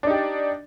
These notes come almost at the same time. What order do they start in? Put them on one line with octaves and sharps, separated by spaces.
D4 D#4 G4 D5